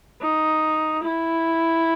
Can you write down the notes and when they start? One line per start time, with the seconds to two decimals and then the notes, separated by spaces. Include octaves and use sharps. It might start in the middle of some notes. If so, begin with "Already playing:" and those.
0.22 D#4
1.04 E4